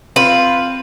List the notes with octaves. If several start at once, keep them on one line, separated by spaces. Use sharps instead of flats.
C4 F4 B4